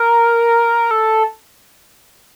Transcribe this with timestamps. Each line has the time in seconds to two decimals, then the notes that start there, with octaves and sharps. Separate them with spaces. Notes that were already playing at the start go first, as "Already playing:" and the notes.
Already playing: A#4
0.91 A4